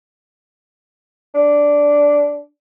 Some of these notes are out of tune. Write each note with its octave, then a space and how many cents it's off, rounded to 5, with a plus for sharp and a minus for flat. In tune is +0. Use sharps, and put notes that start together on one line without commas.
D4 -10